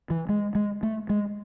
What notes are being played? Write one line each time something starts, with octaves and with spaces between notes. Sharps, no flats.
E3
G#3
G#3
A3
G#3